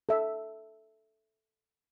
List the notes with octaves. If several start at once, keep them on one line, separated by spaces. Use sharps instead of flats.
A4 E5